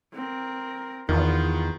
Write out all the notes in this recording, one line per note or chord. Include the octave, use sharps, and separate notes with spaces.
C4 A#4
E2 D#3 B3 F4